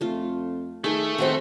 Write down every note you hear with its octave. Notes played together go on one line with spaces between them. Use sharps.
F2 A3 F4
D#3 A3 G#4 A4
F2 D#3 F#4 C5